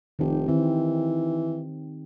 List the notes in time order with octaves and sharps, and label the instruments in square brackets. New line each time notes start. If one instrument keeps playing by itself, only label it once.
[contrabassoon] F1 [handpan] D#3 G4
[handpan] D#3 C4 [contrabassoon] E3